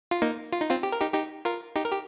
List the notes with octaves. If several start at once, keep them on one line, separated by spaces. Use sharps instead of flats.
F4
A#3 D#4
F4
D#4
C4 F4
G4
A#4
D#4 G4
D#4 G4
F4 A#4
D#4 G4
A#4
G4